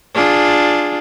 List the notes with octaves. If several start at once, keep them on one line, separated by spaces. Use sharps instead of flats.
D4 F4 G#4